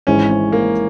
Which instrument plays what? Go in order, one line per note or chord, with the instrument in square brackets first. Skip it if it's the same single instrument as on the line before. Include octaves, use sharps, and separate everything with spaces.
[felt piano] G#1 G#2 E3 [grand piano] C#4
[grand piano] C#4
A#3